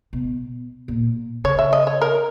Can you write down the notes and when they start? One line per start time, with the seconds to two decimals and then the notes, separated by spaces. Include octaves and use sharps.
0.13 B2
0.88 A#2
1.44 C#3 C#5
1.59 E5
1.73 D#5
1.87 C#5
2.02 A#4